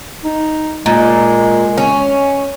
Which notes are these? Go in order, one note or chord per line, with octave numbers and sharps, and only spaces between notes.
D#4
A#2 G#3
C#4